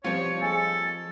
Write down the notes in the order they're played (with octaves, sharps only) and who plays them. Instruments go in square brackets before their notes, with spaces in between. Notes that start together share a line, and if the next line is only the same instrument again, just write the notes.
[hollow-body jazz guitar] F3 C4 F4 [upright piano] G3 C5 C#6 [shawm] C#5
[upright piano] G#4 D#5 G#5 [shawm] A4